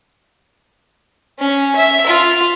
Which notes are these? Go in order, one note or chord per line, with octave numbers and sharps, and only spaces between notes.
C#4
E5
F4